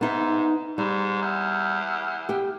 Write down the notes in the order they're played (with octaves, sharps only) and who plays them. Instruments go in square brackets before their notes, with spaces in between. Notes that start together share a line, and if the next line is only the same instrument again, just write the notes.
[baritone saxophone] G#2 [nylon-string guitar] B3 D#4 E5
[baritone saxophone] G#2 [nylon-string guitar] G3
[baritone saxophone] E2
[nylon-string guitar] G4 G5